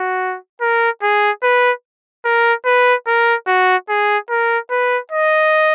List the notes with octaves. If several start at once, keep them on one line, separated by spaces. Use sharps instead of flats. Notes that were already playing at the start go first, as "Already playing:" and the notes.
Already playing: F#4
A#4
G#4
B4
A#4
B4
A#4
F#4
G#4
A#4
B4
D#5